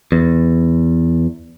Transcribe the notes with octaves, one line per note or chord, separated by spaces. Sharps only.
E2